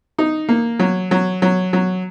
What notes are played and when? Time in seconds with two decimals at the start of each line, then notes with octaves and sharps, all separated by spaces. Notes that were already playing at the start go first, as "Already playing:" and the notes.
0.18 D#4
0.49 A#3
0.79 F#3
1.11 F#3
1.42 F#3
1.73 F#3